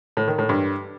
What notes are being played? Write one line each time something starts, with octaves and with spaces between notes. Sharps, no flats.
A2
D#3
A2
G2